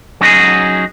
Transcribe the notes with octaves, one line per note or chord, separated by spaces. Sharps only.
F#3 C#4 D#4 F#4 G#4